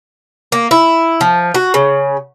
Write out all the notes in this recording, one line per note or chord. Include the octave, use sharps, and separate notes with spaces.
A#3
E4
F3
F#4
C#3